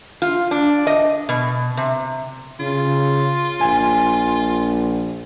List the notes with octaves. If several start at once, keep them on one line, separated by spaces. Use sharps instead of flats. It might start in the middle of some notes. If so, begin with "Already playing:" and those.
F4
D4
D#5
B2
C3
C#3 F4
A#1 G#5